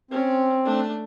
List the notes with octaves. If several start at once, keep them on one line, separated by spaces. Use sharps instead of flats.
C4 C#4
A3 D4